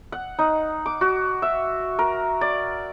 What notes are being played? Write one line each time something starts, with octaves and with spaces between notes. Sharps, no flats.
F#5
D#4
D6
F#4
E5
A#4
D5